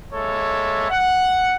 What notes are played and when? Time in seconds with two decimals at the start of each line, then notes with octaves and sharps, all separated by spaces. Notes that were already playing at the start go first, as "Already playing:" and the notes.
0.13 G#3 A#3 A4 C#5 E5
0.90 F#5